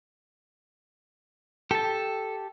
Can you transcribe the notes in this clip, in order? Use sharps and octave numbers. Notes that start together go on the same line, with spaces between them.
G4 A4 A5